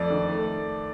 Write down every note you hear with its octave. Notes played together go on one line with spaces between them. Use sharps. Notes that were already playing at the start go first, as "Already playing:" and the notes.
Already playing: F2 A3 D5
D#3
A3